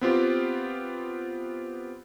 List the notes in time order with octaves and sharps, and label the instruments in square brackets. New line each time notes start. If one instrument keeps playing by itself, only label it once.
[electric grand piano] B3 C4 F4 G4